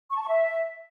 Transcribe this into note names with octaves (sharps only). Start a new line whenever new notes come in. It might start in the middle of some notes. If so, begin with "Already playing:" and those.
C#6
A5
C#6
E5